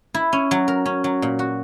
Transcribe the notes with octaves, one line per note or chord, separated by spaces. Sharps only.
E4
C#4
F#3
A#4
C#4
F#3
A#2
F#4